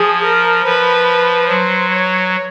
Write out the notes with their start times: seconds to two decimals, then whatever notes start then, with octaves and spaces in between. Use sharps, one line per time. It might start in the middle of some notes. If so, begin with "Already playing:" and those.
Already playing: F3 G#4
0.24 A#4
0.66 F3 B4
1.48 F#3 C5
1.91 C#5